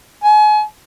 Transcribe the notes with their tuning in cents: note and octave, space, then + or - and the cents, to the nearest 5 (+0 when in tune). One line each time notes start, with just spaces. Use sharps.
G#5 +35